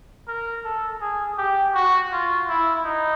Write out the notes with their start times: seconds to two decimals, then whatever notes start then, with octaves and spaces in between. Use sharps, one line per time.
0.28 A#4
0.64 A4
1.01 G#4
1.38 G4
1.74 F#4
2.12 F4
2.49 E4
2.85 D#4